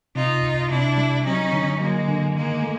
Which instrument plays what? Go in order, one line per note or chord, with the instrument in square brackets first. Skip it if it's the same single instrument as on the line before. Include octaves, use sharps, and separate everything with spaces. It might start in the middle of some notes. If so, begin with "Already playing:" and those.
[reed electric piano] C3 [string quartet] D#4 F4
[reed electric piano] C2
[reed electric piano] C3 [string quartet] D4 E4
[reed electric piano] G3
[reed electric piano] F#3 [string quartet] C#4 D#4
[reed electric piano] D3
[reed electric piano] F#3 [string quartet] G#3 A#3
[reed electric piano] D3
[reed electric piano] D#3 [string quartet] G#3 A#3
[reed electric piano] A3